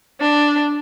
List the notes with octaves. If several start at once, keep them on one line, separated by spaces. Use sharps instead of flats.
D4